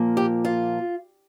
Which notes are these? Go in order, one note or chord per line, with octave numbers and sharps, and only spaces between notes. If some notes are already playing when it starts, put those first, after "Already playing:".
Already playing: A#2 F3 A#3
G4
F4